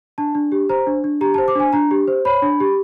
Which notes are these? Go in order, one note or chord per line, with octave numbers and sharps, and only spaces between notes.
D4 A5
D4
G4
C5 A#5
D4
D4
G4 A#5
A5
C5
D6
D4 G#5
D4 A#5
G4
C5
C#5 B5
D4
G4